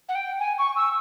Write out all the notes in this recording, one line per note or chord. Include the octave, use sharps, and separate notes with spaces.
F#5
G5
G#5
C#6
E6